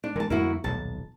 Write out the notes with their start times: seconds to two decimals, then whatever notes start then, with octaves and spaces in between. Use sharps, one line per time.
0.04 D4
0.16 E3 G#3 A#4 A5
0.30 F2 D3 G3 A#3 E4 F#4
0.64 D#1 B1 A5